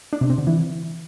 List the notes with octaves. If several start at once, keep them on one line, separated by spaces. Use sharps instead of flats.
D4
C3
C4
D3
E3